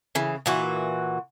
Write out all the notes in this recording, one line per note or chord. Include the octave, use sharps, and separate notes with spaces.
C#3 E3
A#2 E3 F#4